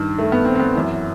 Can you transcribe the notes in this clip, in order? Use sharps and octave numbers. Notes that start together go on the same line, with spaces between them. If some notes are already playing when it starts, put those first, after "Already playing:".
Already playing: G2 D#3
A3
B3
C4
C4
B3
F#2 E3